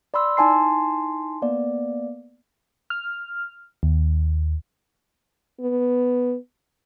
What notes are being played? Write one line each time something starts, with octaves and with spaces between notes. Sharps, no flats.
D5 B5 C6 E6
D#4 E4 G#5 A5 C6 C7
A#3 B3 D5
F6
D#2
B3